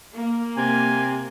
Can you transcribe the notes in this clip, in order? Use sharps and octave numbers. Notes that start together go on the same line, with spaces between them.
A#3
C3 G#5